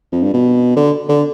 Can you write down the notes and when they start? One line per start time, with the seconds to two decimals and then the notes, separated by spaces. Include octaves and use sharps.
0.12 F2
0.23 G2
0.34 B2
0.77 D3
1.09 D3